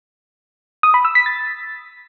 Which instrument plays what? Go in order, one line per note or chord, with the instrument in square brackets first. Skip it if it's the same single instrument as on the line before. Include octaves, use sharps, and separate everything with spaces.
[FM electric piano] D#6
B5
E6
B6
A6